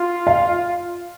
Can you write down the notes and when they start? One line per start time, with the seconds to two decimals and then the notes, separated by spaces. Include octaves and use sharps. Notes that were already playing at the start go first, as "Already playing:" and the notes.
Already playing: F4
0.27 F5